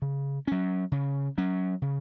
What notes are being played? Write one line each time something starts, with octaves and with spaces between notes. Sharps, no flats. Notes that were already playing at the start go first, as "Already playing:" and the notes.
C#3
F#3 C#4
C#3
F#3 C#4
C#3